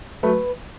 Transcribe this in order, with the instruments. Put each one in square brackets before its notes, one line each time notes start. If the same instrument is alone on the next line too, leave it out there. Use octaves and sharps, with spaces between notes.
[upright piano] F#3 A3 [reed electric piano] B4